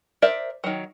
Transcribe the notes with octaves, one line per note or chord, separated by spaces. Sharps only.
A#4 C5 D5 E5
D#3 F#3